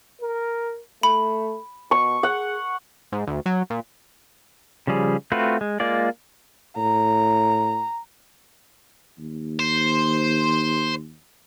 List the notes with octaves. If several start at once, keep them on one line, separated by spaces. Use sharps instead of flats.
A#4
A3 B5
B2 C#6
G#4 F#5
G#2
D2
F#3
A#2
C#3 F3 G3 G#4
A3 C4 F4 F#4 B4
G#3
G#3 A#3 F4 D5
A2 A#5
D#2
C5